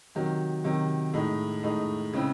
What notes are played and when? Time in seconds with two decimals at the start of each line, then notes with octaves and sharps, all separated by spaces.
0.15 C3 D#3 F#3
0.64 C3 D#3 F#3
1.14 A2 G#3 D#4
1.63 A2 G#3 D#4
2.13 C#3 G#3 C4 E4